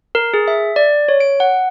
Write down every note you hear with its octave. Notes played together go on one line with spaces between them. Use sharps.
A#4
G#4
E5
D5
C#5
D7
F#5